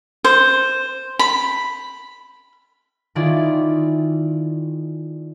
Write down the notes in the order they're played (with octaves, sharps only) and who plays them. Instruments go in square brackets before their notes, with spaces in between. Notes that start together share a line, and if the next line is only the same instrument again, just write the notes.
[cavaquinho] C5
B5
[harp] D#3 E4 F4 G#4 D5